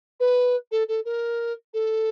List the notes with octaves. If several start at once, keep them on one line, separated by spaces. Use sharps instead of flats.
B4
A4
A4
A#4
A4